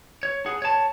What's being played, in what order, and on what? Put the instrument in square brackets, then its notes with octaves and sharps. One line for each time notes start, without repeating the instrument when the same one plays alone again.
[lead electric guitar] C#5
G#4 F#5
C#5 A5